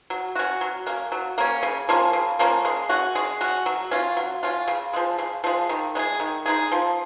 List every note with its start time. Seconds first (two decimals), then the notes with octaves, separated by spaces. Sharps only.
0.10 F#3
0.36 C#4 F#4
0.61 F#3
0.87 A#3 C#4
1.12 F#3
1.38 A#3 C#4
1.63 C#3
1.89 F3 A#3 C#4
2.13 C#3
2.39 F3 A#3 C#4
2.65 G#3
2.89 C#4 F#4
3.15 G#3
3.41 C#4 F#4
3.66 F#3
3.91 C#4 F4
4.17 F#3
4.43 C#4 F4
4.68 C#3
4.93 F3 G#3
5.18 C#3
5.44 F3 G#3
5.69 D#3
5.95 G#3 D#4
5.99 G#4
6.20 D#3
6.46 G#3 D#4 G#4
6.72 F3